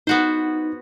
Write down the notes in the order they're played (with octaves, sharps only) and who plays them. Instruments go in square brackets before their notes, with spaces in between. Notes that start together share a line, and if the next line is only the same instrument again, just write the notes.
[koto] B3 F#4 C5 [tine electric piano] D#4